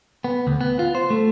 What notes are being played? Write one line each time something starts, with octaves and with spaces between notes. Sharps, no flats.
B3
D2
B3
F4
C5
A3